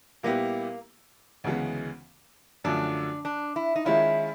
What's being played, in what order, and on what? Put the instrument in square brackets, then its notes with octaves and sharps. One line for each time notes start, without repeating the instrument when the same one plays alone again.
[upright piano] A#2 G3 B3 E4 G4 [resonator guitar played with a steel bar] A#3
[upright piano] D2 C#3 E3 G#3 B3
[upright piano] F#2 D3 F3 A3 [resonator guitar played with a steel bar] D4
[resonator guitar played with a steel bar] D4
E4
D#4
[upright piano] D#3 G#3 C#4 F4 [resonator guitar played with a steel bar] E4